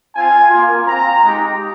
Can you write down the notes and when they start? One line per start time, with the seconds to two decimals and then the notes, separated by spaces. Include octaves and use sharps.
0.14 C4 F4 G#5
0.50 A#3 F4
0.86 C4 F4 A#5
1.23 G#3 D#4 G4